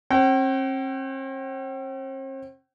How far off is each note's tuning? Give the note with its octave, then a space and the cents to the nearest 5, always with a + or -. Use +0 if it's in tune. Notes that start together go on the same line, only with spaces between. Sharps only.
C4 +45 G5 -40